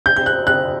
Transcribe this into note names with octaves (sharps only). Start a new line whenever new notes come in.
G6
G6
F#6
F#6